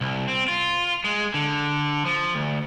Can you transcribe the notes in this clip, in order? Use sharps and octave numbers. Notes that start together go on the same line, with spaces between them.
C2
C4
F4
G#3
D3
F3
D2